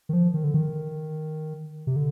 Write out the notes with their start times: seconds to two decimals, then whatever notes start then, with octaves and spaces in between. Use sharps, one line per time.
0.09 D#3
0.13 F3
0.34 D#3
0.44 D3
0.54 D#3
1.87 C3
1.96 D3